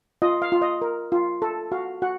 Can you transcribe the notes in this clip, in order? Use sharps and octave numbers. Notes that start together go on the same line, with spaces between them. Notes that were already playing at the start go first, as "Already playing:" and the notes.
F4 D#5
F5
F4
D#5
A#4
F4
A4
F#4 F5
F#4 F#5